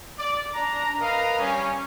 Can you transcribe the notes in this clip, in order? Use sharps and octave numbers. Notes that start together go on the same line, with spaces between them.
D5
D4 A#5
A#4 B4 D#5 F5 A#5
G3 C#4